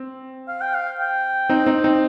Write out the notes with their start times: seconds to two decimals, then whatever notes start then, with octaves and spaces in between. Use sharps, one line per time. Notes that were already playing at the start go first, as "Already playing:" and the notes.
Already playing: C4
0.48 F5
0.61 G5
0.74 F5
0.99 G5
1.49 C4 D#4
1.66 C4 D#4
1.84 C4 D#4